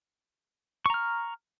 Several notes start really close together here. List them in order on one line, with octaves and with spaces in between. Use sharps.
C#6 A#5 F6